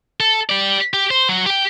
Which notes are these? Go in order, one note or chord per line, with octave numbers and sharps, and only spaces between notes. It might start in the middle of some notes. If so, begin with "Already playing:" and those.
A4
G4 D5
G4
C5
F#3 F#4
G4 G5